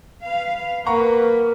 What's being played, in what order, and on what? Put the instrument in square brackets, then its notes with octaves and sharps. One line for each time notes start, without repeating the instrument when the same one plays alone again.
[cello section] B4 F5
[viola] A#3 [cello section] B4 [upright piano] F#5 A#5 C#6